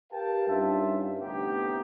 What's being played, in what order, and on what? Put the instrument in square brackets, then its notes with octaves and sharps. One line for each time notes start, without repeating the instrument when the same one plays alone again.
[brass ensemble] G4 A#4 B4 F5 G5 A5
G2 C#4 D#4 F4 E5
D2 A2 C3 B3 D#4 G4